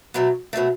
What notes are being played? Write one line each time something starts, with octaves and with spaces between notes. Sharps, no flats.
B2 F#3 A3
B2 F#3 A3